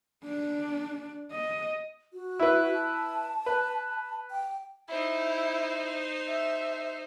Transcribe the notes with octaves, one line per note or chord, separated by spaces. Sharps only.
D4
D#5
F#4
E4 B4
A5
B4
G5
D#4 E4 C5
E5